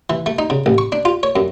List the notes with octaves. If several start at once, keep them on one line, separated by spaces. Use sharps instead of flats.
E3
A3
D#4
C#3
A1
C#6
D4
F4
C#5
F#2